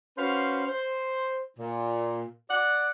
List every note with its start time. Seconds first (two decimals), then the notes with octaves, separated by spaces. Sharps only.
0.17 C#4 F#4 B4 C5 F5
0.67 C5
1.58 A#2
2.50 D5 F#5